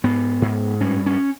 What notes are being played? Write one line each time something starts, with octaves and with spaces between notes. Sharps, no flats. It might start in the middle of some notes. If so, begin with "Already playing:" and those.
G#2 B3
G#2
G2 C#4
C#4